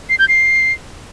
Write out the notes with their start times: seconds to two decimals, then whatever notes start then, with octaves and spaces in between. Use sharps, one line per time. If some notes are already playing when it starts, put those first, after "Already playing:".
0.09 C7
0.19 G6
0.28 C7